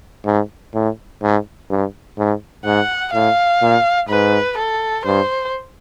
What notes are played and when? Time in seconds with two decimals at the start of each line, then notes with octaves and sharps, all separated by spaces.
0.25 G#2
0.74 A2
1.22 G#2
1.70 G2
2.18 G#2
2.65 G#2 F#5
3.14 A2 F5
3.62 A#2
4.09 G#2 B4
4.57 A4
5.05 G2 C5